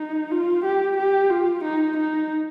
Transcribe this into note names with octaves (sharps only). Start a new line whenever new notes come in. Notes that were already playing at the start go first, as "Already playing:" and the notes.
Already playing: D#4
F4
G4
G4
F4
D#4
D#4